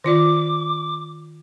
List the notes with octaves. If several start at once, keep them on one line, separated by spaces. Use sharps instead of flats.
D#3 F4 D5 D6